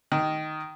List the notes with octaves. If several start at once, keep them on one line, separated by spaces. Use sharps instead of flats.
D#3